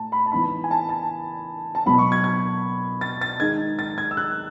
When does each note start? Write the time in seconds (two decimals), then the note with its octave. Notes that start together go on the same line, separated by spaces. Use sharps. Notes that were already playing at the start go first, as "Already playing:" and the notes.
Already playing: A2 A5
0.12 B5
0.26 A5
0.32 E3 B3 D#4 B5
0.64 G#5
0.71 A5
0.89 A5
1.75 A5
1.86 B2 F#3 B3 B5
1.98 C#6
2.12 G#6
2.24 G#6
3.01 A6
3.21 A6
3.40 D#3 G#3 D#4 G#6
3.79 A6
3.98 G#6
4.11 E6
4.17 F#6